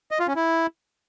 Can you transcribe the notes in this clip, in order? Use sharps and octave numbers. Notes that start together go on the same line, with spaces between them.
D#5
F4
C#4
E4